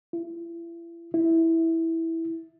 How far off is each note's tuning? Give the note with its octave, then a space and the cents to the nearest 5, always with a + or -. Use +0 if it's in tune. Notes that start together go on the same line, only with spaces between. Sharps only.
E4 +35
E4 -10